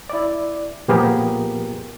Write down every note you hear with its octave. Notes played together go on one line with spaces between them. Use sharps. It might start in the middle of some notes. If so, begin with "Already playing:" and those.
E4 D5
A#2 F3 B3 G4 G#4 A#4